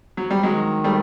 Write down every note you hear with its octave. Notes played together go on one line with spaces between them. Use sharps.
F#3
G3
D#3 F#3 G#3
G3 A3